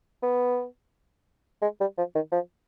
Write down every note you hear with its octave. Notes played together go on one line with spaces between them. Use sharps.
B3
G#3
G3
F3
D#3
F3